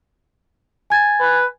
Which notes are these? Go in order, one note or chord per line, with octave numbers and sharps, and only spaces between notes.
G#5 G#6 A6
B4